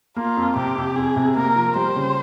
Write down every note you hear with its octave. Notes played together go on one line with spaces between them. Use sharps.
A#3 F4
F2
C3 G4
F2
F2 G#4
C3
A#3 A#4
F3
G3 C5
C#3